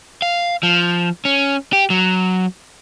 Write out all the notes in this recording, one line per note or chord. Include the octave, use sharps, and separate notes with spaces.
F5
F3
C#4
G4
F#3